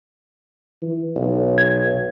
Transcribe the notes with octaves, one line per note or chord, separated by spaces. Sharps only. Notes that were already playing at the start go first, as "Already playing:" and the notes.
E3
B1
G#6